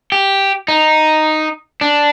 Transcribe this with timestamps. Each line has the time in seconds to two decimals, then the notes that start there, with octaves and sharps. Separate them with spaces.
0.12 G4
0.68 D#4
1.81 D4